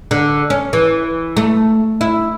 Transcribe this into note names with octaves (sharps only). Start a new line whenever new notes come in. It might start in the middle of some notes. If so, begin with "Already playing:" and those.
D3
C#4
E3
A3
E4